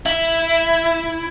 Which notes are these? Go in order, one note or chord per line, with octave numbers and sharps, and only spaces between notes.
E4